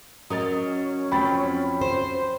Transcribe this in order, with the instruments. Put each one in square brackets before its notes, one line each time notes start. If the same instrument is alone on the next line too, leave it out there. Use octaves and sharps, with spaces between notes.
[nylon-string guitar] F#3 A#4 D#5 [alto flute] C#4 [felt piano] D#6 A6
[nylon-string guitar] F2 F#3 C4 [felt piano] G5 B5 A6
[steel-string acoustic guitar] C5